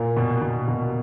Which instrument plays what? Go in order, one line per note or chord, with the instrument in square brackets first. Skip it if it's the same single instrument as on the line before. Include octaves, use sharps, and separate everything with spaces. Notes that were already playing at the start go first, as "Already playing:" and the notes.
Already playing: [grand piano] A#2 A#4
B2
B2
B2